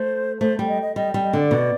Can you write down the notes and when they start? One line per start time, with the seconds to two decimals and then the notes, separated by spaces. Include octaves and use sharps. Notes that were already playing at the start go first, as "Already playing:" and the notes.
Already playing: A3 C5
0.40 A3 C5
0.59 G3
0.68 D#5
0.82 D#5
0.96 G3 D#5
1.14 G3
1.23 D#5
1.33 D3 D5
1.51 B2